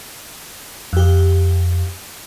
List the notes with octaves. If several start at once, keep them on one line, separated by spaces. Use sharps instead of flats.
F2 G4